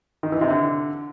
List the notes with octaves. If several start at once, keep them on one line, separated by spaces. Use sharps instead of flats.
D#3
E3
C3
D3